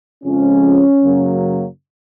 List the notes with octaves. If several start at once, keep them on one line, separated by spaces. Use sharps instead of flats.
F2 C#3 F3 G#3 C#4
F#2 C#3 F#3 A#3